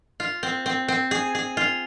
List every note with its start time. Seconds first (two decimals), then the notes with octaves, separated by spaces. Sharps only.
0.20 F4
0.43 C4
0.66 C4
0.88 C4
1.11 G#4
1.35 G#4
1.57 F4